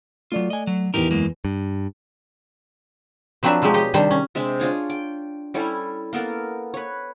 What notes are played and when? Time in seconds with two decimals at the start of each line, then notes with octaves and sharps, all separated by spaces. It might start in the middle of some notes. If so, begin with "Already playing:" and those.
0.32 F#3 A3 F4 D5
0.50 D#5 G#5
0.67 F#3
0.94 E2 E3 D#4 G4 A#4
1.11 F#2 G#3 A#3
1.45 G2
3.43 F3 F#3 C4 D4 B4 E5
3.62 B2 F3 F#3 G#3 G4
3.74 G4 D#5
3.94 C3 D#3 G3 D4 C5
4.11 C#4
4.35 C3 G#3 D4 E5
4.60 D4 F4 G#4 C#5
4.90 G5
5.54 G3 C#4 E4 A4
6.13 A#3 B3 A4 A#4
6.74 B4 C#5